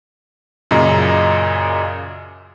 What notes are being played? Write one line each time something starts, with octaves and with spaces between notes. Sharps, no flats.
F#2 A#2 C#3 D#5 A#5